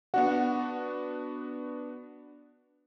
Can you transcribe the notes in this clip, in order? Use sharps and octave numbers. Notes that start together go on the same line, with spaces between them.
B3 D4 F#4 F#5